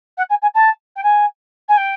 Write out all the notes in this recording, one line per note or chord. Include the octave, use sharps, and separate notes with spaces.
F#5
G#5
G#5
A5
G5
G#5
G#5
G5